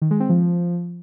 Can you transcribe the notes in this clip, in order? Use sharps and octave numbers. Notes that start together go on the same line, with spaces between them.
D#3
G#3
C4
F3